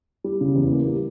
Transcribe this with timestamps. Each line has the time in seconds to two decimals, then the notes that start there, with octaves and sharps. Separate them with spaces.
0.24 G3
0.41 C#3
0.56 E2
0.72 A#3
0.87 G3